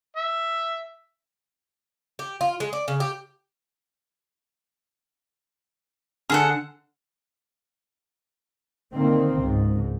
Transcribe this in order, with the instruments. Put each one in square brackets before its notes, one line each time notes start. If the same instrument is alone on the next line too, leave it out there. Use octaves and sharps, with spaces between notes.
[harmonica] E5
[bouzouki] G4
F4
G#3
D5
C#3
G4
[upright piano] D3 F6 [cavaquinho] G#4 A4 F#5
[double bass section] D3 D#3 A#3 C4
C#2 G#2